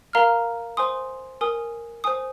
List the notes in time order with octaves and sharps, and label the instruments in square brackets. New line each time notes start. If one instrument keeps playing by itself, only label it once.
[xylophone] A#4 F5 A#5 F6
C5 G#5 C6 D#6
A#4 G#5 D#6
C5 G#5 D#6